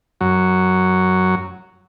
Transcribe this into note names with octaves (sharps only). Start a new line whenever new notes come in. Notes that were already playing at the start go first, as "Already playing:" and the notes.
F#2 F#3